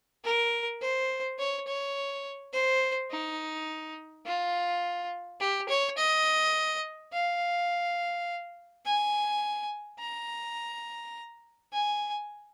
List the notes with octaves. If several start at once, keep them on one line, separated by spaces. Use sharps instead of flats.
A#4
C5
C#5
C#5
C5
D#4
F4
G4
C#5
D#5
F5
G#5
A#5
G#5